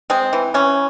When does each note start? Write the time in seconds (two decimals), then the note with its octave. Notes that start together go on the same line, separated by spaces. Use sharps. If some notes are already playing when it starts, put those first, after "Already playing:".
0.10 G#3 C4
0.33 E3
0.54 E3 C#4